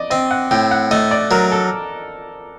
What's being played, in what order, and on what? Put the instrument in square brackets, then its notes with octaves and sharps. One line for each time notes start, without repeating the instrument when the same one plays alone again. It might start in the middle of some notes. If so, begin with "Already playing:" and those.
Already playing: [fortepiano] D5 D#5
[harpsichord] C4 [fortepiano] D#5
[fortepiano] F#5
[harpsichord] A2 [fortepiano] G5
[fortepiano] F#5
[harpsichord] A3 [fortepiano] D#5
[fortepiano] D5
[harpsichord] F#3 [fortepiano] A#4
[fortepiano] A4